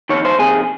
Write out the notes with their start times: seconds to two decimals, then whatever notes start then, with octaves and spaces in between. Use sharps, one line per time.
0.09 F2 C3 D#3 C#5
0.25 C5
0.39 F2 C3 D#3 G#4